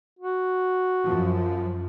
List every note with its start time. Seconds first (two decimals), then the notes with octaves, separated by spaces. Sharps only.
0.19 F#4
1.05 F#2 F3